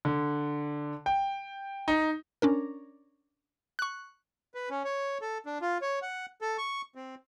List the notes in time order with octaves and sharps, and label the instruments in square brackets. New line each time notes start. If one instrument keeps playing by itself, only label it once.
[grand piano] D3
G5
D#4
[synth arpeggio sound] C#4 D4 A#4
C#6 F#6
[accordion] B4
C#4
C#5
A4
D4
F4
C#5
F#5
A4
C#6
C4